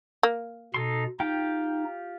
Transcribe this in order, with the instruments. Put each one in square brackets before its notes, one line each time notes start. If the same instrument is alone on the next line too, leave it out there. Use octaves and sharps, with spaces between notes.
[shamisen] A#3
[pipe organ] B2 [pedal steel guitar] D#4 A4 C6
[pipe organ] D#4 [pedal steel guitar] F4 G4 G5